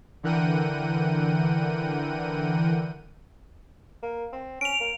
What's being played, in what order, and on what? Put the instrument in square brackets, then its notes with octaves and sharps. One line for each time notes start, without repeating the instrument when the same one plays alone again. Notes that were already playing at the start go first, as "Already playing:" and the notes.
[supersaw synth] D3 E3 A#4 F#5 G5 D#7
[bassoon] A#3
C4
[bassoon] C#4 [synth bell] D7 F7
[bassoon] A#3